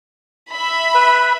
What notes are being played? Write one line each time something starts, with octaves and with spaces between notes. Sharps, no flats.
E5 B5
B4